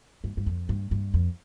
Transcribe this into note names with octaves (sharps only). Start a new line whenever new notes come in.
G2
G2
F2
G2
G2
F2